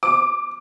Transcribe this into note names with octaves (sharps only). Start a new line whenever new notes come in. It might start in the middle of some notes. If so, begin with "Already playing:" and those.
D6